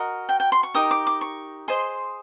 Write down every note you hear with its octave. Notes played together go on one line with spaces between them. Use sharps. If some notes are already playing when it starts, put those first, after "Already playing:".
Already playing: F#4 A#4 D#5
G5
G5
C6
C#6
D#4 G4 A#4 D#6
D6
D6
C#6
G#4 C5 D#5 C6